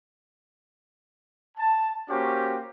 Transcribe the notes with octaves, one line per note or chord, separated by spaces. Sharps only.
A5
A#3 C#4 F#4 G4 C5 D6